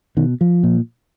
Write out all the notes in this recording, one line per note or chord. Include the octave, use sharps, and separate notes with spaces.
B2 D#3
F3
A#2